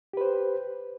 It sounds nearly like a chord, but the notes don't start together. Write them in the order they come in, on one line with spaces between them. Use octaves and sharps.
G4 B4 C5